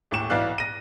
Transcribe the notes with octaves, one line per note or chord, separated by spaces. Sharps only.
D#1 A2 C#6 E7
B1 E3 D5 F5 F#6
A#6 D#7